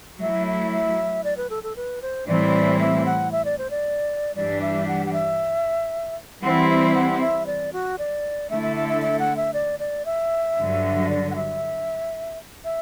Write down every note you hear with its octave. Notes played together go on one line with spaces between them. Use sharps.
F#3 A3 E4 E5
E5
E5
D5
B4
A4
A4
B4
C5
A2 E3 G3 C4 E4 D5
E5
F#5
E5
D5
C5
D5
G2 E3 G3 D4 G4 D5
E5
F#5
F#5
E5
E3 G3 C4 E4 F#5
E5
F#5
E5
D5
F#4
D5
D3 A3 E4 A4 E5
E5
E5
E5
E5
F#5
E5
D5
D5
E5
G2 D3 F#3
D5
F#5
E5
E5